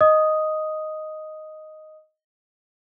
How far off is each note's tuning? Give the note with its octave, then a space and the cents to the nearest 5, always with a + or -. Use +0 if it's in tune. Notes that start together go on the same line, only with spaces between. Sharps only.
D#5 +0 D#6 +0